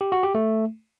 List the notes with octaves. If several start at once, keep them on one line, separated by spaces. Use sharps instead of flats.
G4
F#4
G4
A3